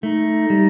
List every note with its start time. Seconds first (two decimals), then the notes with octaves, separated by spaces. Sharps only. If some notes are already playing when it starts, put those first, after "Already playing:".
0.03 A3 D#4
0.50 G3